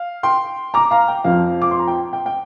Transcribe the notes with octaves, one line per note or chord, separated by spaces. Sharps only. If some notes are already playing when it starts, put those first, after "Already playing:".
Already playing: F5
G5 C6
A#5 D6
F5 A#5
G5
F2 F3 C4 F5
D6
C6
A#5
G5
G5
G5